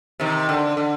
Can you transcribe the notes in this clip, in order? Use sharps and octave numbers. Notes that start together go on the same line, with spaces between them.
C3 D#3
D3
D3